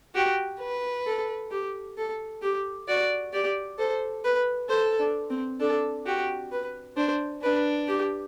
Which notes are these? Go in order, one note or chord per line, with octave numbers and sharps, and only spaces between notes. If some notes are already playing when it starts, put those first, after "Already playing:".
F#4 G4
B4
A4
G4
A4
G4
F#4 D5
G4 D5
A4 C5
B4
A4 C5
D4
C4
D4 A4
F#4 G4
B4
D4 C5
D4 B4
G4